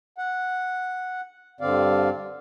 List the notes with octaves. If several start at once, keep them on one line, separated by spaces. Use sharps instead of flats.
F#5
G2 D3 C4 D5 F5